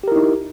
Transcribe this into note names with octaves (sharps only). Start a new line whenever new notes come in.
D#4 E4 G4 A#4